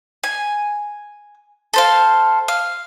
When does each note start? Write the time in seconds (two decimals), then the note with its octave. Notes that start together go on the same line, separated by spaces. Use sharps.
0.24 G#5
1.74 A4 C5 F5
2.48 F5